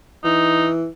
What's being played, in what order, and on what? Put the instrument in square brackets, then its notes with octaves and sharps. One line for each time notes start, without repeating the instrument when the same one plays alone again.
[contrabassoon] E3 [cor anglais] D#4